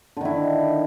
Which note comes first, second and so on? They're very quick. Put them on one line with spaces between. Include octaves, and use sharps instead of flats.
D3 D#3 E4